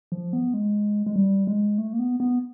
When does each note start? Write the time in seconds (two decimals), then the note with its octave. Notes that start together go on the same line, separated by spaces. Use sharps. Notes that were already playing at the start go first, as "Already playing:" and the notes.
0.12 F3
0.33 B3
0.54 G#3
1.06 G#3
1.16 G3
1.47 G#3
1.78 A3
1.93 A#3
1.99 B3
2.20 B3